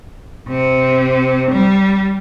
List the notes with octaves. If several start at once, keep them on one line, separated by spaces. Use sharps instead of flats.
C3
G3